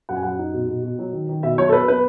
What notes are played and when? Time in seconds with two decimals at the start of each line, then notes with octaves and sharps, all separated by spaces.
0.09 F#2 F#5
0.16 G#5
0.23 F#2 F#5
0.39 D#4
0.54 B2
0.69 B2
0.83 B2
0.99 F#3
1.13 D#3
1.29 D#3
1.43 B2 E5
1.58 F#3 C#5
1.69 A4
1.73 B3 B4
1.88 B3 B4